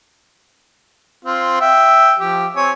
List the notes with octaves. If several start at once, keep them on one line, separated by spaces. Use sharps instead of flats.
C4 F4
E5 G5
F3 G4
C4 C#5 G#5